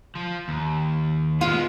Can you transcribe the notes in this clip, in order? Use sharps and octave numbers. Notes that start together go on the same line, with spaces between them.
F3
D#2
G#3 B3 F4